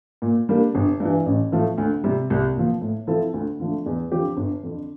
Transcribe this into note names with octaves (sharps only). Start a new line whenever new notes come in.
A#2
G3 A#3 D4
G1
G2 E3
A1
A2 F3 A3
D2
C3 G3
C2
A#2 F3
A2
F3 C4 E4 A4
D2
D3 F3 A3
E2
D3 F3 C4 G4
G1
F2 D3